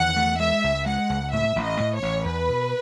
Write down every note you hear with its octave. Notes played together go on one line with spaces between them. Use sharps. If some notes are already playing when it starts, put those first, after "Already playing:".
Already playing: E2 D#3 F#5
A3
G#3 E5
C#2
G#3 F#5
C#2
A2 E5
A1
D#5
A2
C#5
A1
E2 B4
B2